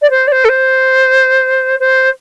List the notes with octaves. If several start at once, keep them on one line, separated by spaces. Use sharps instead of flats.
D5
C5
D5
C5
A4
C5
C5